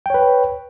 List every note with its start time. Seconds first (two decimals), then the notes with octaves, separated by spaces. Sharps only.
0.06 G5
0.10 C#5
0.14 B4